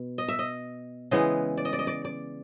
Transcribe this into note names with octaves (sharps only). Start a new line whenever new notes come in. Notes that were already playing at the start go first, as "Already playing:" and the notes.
Already playing: B2
D#5
E5
D#5
C#3 E3 G#3 B3 D#5
D5
D#5
D5
D#5
D5
D5